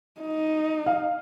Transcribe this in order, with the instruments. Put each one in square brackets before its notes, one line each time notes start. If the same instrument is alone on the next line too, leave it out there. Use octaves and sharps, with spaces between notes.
[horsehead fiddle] D#4
[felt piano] F5